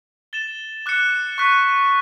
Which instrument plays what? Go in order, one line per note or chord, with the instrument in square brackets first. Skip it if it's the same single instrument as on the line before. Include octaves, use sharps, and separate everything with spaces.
[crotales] A6 E7 G7
D6 F#6 C#7
C#6 F#6 B6